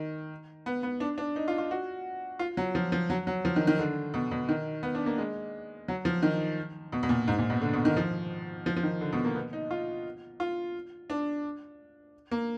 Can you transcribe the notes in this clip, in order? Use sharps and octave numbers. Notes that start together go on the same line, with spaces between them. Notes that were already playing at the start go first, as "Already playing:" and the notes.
Already playing: D#3
B3
B3
D4
D4
D#4
F4
F4
F#4
F4
F#3
F3
F3
F#3
F#3
F3
D#3
D#3
D3
B2
B2
D#3
B3
D4
A#3
G#3
F#3
F3
D#3
B2
B2
A#2
G#2
A#2
B2
D3
B2
D#3
F3
F3
F3
D#3
D3
B2
A#3
B3
D#4
F4
F4
D4
A#3